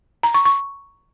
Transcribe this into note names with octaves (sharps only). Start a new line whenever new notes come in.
A#5
C#6
C#6